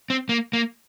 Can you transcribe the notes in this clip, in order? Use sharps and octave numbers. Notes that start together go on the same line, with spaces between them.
C4
A#3
A#3